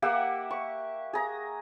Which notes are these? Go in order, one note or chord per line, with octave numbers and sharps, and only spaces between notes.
A#3 G4 E5 F#5
C#6
G#4 A#5